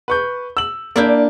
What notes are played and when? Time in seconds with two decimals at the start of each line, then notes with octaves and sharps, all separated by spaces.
0.08 B4 C#6 G6
0.57 E6 F#7
0.96 A#3 D4 E4 D5 G6